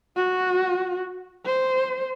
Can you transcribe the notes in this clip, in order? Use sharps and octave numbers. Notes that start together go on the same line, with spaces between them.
F#4
C5